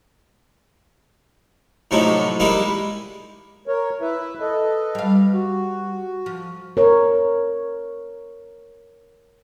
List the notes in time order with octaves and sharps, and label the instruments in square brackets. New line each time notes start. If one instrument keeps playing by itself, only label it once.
[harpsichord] A2 C3 F3 F#3 D#4 E4
G3 G#3 A#3 D#4 E4
[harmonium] A#4 C#5
E4 B4 E5
A4 B4 D#5
[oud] G3 F5
[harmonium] F#4
[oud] F3
[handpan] A#4 C#5